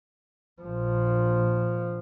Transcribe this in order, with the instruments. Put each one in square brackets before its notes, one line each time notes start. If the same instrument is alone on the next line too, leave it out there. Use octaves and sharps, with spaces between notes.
[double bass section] A#1 [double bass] F3